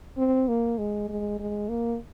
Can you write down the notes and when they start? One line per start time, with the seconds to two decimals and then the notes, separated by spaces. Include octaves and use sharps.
0.18 C4
0.48 A#3
0.78 G#3
1.09 G#3
1.39 G#3
1.69 A#3